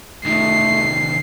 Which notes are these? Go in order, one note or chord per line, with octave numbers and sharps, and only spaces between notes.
C2 D#3 A3 C7